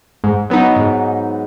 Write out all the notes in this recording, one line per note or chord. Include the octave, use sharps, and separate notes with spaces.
G#2
F#3 B3 D#4
G#2